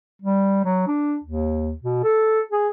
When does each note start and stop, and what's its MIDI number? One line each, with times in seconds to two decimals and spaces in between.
0.22 0.61 55
0.65 0.82 54
0.87 1.17 62
1.24 1.72 39
1.82 1.99 47
2.04 2.41 69
2.51 2.69 68